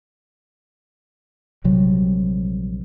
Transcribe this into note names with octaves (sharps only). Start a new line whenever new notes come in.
A#1 C3 F#3 G3